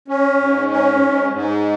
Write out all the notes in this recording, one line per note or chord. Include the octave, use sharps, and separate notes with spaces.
C#4
G#2
C#4
G#2
G#2